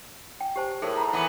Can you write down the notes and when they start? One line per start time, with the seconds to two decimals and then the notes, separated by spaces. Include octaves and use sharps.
0.41 G5
0.56 G4 C5 A5
0.82 A2 G#4 A#4 D#5
0.97 A#5 B5
1.13 E3 B3